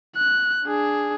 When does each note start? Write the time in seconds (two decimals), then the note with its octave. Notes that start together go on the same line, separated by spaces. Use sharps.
0.16 F#6
0.64 D4 G#4